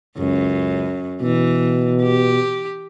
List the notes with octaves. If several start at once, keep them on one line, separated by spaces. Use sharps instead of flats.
C#2 F#2
B2 E3
G4